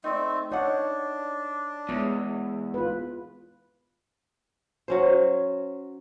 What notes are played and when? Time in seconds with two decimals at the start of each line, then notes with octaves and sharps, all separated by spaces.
0.04 A3 C4 D#4 D5
0.52 D4 D#4 C#5 F#5
1.89 E2 G#3 C#5
2.74 F4 B4
4.88 F#3 C#4 C5